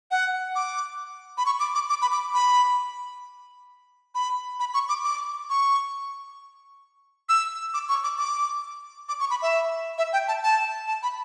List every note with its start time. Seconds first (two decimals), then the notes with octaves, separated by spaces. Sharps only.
0.11 F#5
0.56 D6
1.38 B5
1.46 C#6
1.60 D6
1.75 D6
1.90 D6
2.02 B5
2.12 D6
2.34 B5
4.15 B5
4.60 B5
4.74 C#6
4.89 D6
5.04 D6
5.50 C#6
7.29 E6
7.74 D6
7.89 C#6
8.04 D6
8.18 D6
9.09 D6
9.20 C#6
9.31 B5
9.42 E5
9.98 E5
10.13 G5
10.28 A5
10.43 A5
10.88 A5
11.03 B5